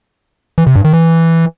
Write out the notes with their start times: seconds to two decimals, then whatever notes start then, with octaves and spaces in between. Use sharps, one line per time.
0.58 E3
0.67 C3
0.76 G2
0.85 D#3
0.93 E3